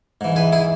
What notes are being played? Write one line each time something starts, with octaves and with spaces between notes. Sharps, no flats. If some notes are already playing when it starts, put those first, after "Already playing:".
G#2 E3
G#4 B4
E4 G#4